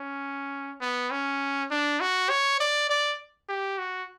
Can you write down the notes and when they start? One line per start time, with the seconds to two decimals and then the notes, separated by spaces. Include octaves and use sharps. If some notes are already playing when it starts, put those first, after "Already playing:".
Already playing: C#4
0.81 B3
1.11 C#4
1.71 D4
2.01 F#4
2.29 C#5
2.60 D5
2.90 D5
3.49 G4
3.79 F#4